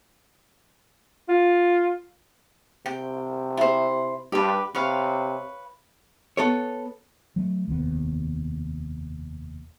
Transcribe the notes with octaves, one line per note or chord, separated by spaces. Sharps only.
F4
C3 G5
E4 C5
G2 G4 B4
C3 B4 C#5 F5
B3 A4 C#5
F#3 A3
F1 D#2 C3 B3